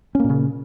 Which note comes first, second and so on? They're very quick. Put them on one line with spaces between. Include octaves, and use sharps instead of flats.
C#4 A#3 A#2 C#3